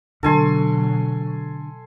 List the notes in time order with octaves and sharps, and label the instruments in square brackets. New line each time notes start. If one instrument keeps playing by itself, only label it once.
[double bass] B2 F#3 [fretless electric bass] D3 [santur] A4 G#5 C6